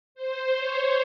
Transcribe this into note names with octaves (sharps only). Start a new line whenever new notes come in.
C5
C#5